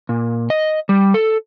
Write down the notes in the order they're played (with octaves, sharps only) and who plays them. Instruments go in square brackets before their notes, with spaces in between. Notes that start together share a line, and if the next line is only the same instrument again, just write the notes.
[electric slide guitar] A#2
D#5
G3
A4